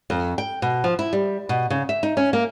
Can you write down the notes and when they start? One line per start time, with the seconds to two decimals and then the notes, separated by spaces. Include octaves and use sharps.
0.10 F2
0.38 G5
0.62 B2
0.84 F3
0.99 E4
1.13 G3
1.49 B2
1.70 C#3
1.89 E5
2.03 D#4
2.17 C#4
2.33 A#3